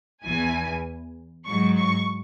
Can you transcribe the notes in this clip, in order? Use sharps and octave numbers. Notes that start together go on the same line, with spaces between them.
E2 E3 G#5
G#2 F#3 C#6
C#6